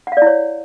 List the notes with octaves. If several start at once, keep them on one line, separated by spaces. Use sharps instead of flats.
E4 C#5 D5 F5 F#5